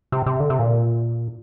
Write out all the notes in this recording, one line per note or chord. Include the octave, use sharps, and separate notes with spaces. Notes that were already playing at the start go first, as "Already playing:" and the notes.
C3
C3
D3
C3
A#2